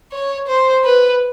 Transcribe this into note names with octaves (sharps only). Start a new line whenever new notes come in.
C#5
C5
B4